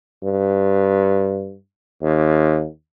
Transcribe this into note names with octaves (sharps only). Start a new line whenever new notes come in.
G2
D#2